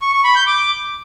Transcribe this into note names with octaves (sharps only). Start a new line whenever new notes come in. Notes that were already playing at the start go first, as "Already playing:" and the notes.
C#6
C#6
B5
G6
D6